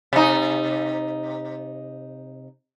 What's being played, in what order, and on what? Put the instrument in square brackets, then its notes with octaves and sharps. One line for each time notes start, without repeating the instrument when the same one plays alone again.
[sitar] C3 D#4